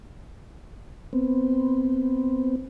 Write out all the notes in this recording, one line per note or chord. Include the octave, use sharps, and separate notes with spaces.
B3 C4